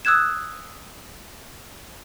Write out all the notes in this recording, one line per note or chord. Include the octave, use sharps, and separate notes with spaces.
D#6 E6 F#6 G#6 E7